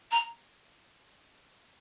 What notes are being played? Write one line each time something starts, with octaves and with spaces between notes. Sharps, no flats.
A#5